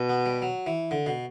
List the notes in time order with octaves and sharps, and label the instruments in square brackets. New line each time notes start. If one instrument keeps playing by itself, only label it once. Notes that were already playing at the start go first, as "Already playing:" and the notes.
Already playing: [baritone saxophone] B2
[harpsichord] B3
G3
F#3
E3
D3
B2